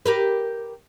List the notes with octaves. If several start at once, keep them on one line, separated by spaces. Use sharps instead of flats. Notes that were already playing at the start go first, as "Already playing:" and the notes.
G4 A#4 B4